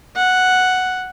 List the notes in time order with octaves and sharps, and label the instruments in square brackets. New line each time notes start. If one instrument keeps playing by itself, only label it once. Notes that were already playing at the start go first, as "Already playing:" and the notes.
[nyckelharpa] F#5